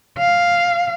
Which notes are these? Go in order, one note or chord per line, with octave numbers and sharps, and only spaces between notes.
F5